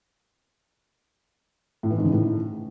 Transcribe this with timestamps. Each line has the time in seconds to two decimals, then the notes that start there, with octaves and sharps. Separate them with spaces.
1.83 A2
1.90 E3
1.98 G#2
2.05 C#3
2.12 A2